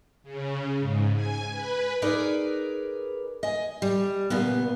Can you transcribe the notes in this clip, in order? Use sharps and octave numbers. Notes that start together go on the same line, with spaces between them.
C#3
G#2
G#5
B4
D#4 G#4 A#4 B4 D5
D#5 G#5
G3
A#2 C#3 E3 B3